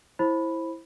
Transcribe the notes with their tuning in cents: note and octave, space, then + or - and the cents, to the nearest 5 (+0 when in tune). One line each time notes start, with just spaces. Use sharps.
E4 +0 C5 +20 B5 +0